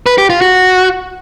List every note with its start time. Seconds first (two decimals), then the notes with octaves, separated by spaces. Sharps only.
0.06 B4
0.18 G4
0.30 F4
0.41 F#4